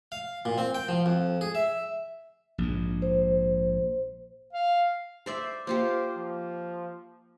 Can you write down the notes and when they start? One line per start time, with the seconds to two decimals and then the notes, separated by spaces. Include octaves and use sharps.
0.12 F5
0.45 A#2
0.58 C4
0.75 G5
0.88 F3
1.06 F2
1.41 G#4
1.55 E5
2.58 A#1 G#2
3.02 C5
4.53 F5
5.26 C5 D5 E5
5.67 A#3 F4 G4 C5
6.16 F3